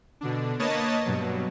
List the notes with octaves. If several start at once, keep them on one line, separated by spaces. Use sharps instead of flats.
B2 D3 D4
A#3 B4 C#5 D#5 A5
G2 B2 F#3